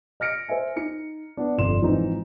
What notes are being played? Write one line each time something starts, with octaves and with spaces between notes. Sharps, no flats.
D#5 F6 A#6 C#7 D7
C5 D#5 E5 G#5
D#4 C#7
B3 D4
G1 F2 D3 D5 C6 E7
G#2 E3 F3 C4 D#4